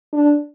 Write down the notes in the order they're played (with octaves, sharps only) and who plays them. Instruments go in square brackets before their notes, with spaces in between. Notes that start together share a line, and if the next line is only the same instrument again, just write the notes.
[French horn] D4